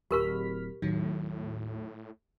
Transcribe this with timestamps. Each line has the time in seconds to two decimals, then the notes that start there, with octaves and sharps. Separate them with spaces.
0.11 D1 G4 A#4 B5 C#6 F6 B6
0.82 D#2 A2 D#3 F#3